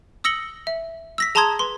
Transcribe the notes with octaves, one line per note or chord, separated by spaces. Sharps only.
D#6 E6 A#6 C#7 F#7 G7
E5
E6 A#6 B6
G#4 A5 A#5 C6 D#6 G#6
B4 C6